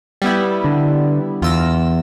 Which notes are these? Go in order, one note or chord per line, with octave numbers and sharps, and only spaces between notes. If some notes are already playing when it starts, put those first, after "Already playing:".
G3 B3 E4
D3
E2 F4 E6 A#6